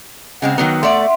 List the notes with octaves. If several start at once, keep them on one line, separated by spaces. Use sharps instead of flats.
C#3 G#3 C4 F#5
D#3 F#3 B3
A3 D5 E5 F#5 C6